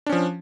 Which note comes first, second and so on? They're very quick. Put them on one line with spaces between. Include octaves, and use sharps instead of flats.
D4 C#4 F3